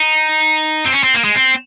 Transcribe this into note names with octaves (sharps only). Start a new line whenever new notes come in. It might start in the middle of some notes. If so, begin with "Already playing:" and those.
Already playing: D#4
C4
C#4
C4
A#3
G#3
C4